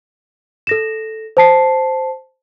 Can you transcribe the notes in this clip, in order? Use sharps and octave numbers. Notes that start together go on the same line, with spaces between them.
A4 A#6 E7
C5 A5 C7